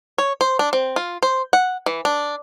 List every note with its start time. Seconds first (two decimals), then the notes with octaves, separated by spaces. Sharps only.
0.18 C#5
0.41 C5
0.59 D4
0.73 C4
0.96 F4
1.23 C5
1.53 F#5
1.86 E3
2.05 D4